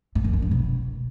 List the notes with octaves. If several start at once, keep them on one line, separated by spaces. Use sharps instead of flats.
G#2
F#2
G2
D3
B2